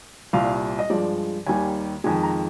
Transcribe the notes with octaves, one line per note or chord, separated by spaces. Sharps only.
C2 A#2 G3 F5
D#5
G2 F3 G#3 D5
D#2 D#3 G3 G#5
F2 D#3 G#3 G#5
A#5